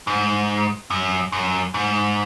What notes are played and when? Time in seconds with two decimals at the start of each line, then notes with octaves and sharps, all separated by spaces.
0.07 G#2
0.90 F#2
1.32 F#2
1.74 G#2